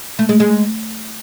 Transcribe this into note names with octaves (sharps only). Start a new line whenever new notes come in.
A3
G#3
G#3